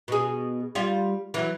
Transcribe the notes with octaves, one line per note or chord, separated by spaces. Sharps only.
B2 G#4
G3 F4
E3 F#3